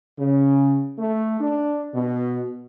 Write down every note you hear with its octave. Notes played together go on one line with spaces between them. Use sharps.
C#3
A3
D4
B2